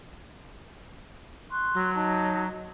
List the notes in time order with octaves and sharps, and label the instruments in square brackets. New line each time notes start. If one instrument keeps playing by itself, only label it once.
[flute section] C6 C#6 F#6
[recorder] F#3
[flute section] D#4 C#5 A5